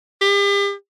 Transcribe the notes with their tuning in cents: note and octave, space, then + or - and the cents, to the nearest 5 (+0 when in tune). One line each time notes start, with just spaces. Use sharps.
G4 +40